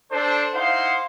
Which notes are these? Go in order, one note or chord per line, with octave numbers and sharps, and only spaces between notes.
D4 A4 C5
D#4 E4 C5 F5 F#5 C6